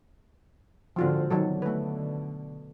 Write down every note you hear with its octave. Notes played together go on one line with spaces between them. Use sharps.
G#2 D3 F3 C4 F4 F#4
B2 D3 D#3 F#3 A4
A3 B4